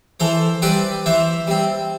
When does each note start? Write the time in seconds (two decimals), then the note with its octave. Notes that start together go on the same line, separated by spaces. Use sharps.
0.20 E3 A4 C5
0.62 G3 C4 B4 D5
1.06 E3 C5 E5
1.47 G3 C4